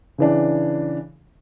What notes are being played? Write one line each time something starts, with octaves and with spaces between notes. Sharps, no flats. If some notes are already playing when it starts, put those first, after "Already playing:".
C#3 E3 D4